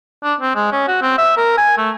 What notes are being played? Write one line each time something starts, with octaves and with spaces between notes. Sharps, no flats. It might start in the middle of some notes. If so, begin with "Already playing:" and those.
D4
C4
G#3
C#4
F#4
C4
E5
A#4
G#5
A3